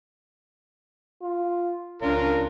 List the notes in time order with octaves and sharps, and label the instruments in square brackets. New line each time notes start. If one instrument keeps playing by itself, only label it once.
[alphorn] F4
[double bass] C#2 D4 [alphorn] C#4 [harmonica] F4 A#4